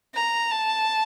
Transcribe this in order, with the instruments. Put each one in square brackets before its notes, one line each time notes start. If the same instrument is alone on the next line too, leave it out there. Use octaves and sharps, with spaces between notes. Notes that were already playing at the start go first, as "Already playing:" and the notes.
[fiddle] A#5
A5